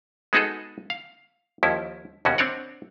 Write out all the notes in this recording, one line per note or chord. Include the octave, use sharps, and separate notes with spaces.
G#3 B3 D#4 F#4 G#4 A4
F5
D#2 F3 C#4 E4
D#2 B2 C#4 F#4
C4 D4 C#5 D5 F#5